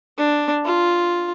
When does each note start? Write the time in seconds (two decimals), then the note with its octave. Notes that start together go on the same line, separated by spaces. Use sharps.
0.18 D4
0.65 F4